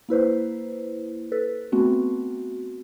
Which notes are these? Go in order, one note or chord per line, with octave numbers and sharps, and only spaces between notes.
A#3 E4 B4 C5
A4 B4
A3 B3 C4 F#4